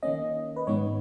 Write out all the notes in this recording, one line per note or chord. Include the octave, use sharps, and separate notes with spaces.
D#3 A#3 C#4 D#5
B4
G#2 D#3 G#3 B3 D#4 C#5